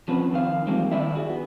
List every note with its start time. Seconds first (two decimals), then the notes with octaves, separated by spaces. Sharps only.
0.08 F3 C4 C#4 B4
0.32 F2 D#3 G4 F5
0.67 E3 F3 G3 G#3 A#3 C4
0.92 D#3 D4 E4 D5 E5
1.15 F#4 G#4
1.30 B3